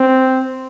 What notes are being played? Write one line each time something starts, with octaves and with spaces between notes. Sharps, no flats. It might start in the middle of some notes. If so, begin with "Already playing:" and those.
Already playing: C4